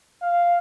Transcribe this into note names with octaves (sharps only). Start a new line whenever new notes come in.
F5